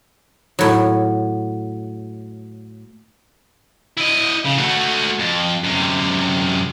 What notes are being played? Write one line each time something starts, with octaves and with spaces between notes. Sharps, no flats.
A2 F#3
E4 D#5
C#3
A3 F#4
F2
F#2 C3